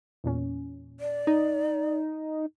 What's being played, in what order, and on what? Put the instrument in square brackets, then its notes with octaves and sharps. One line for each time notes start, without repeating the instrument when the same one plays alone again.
[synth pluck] E2 A#2 C#4
[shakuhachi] D5
[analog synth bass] D#4